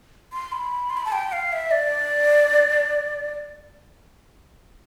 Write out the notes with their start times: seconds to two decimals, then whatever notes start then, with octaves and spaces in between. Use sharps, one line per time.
0.33 C6
0.52 B5
0.90 C6
0.97 B5
1.05 A5
1.12 G5
1.32 F5
1.52 E5
1.71 D5